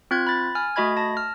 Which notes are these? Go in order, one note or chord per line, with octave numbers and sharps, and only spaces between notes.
C4 F4 F#6 G#6
B5 A6
G#5 F6
A3 F#4 D#5 B5 G#6
A5 A#6
F6